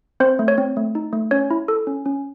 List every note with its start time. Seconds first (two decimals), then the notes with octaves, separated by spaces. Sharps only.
0.20 C4 C5
0.39 A3
0.48 C#5
0.58 C4
0.77 A3
0.95 D#4
1.13 A3
1.31 C#4 C#5
1.50 E4
1.68 A4
1.87 C#4
2.06 C#4